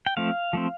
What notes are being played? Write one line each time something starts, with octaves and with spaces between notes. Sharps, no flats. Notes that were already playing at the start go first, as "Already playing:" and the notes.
G5
F3 A3 C4 F5
F3 A3 C4